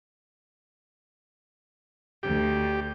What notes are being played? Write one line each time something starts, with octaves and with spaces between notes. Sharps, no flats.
D2 G4